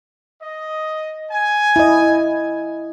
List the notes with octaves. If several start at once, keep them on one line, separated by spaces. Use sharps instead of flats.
D#5
G#5
E4 D#5